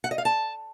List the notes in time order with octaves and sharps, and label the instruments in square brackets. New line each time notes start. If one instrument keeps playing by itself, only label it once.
[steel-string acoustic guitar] F#5
D#5
F5
A5